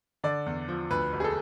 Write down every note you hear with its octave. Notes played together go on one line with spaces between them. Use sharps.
D3 D5
E2
F3
D2 B4
E1
G#4
A4